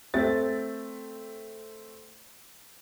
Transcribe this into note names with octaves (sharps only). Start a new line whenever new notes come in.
A3 C4 A6